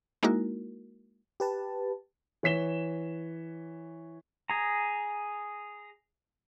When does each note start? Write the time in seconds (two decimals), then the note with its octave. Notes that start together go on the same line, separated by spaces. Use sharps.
0.23 G#3 A#3 D#4 E4 F#4 A#4
1.40 G4 B4 A5
2.43 E3 C#5 B6 E7 G7
4.50 G#4 A#5